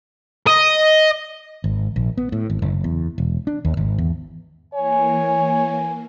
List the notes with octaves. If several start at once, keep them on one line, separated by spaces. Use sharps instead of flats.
D#5
G#1
A#1
B3
A2
G#1
F#1
E2
E1
D4
D#2
G#1
E2
E3 A#3 C#5 G#5